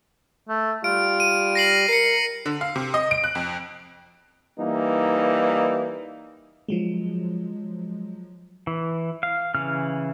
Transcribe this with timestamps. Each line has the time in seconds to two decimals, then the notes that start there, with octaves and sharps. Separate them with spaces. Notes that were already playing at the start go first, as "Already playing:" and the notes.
0.49 A3
0.84 G3 F4 D7
1.20 D#7
1.55 A#6 C7 F#7
1.89 A#4 C7 C#7
2.46 D3
2.61 F5
2.76 C3
2.94 D#5
3.11 D7
3.24 F#6
3.35 F2
4.58 E3 G3 A#3 D#4
6.69 F3 F#3 G#3
8.67 E3
9.23 F5
9.55 C#3 E3 F6